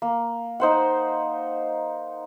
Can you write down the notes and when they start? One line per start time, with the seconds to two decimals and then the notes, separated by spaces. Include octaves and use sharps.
0.02 A#3
0.60 D#4 C5 F#5